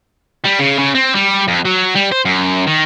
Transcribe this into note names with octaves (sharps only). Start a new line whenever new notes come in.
G3
C#3
C#3
C4
G3
F2
F#3
G3
C5
F#2
D#3